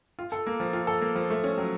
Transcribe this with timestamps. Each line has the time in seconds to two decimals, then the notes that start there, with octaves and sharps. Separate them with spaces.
0.19 F4
0.32 A4
0.47 A#3
0.60 F3
0.73 F4
0.87 A4
1.01 A#3
1.15 F3
1.30 A3
1.44 C#4
1.58 F#3